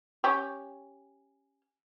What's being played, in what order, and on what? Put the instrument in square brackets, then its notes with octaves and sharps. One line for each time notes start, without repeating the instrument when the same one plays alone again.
[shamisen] C#4 G4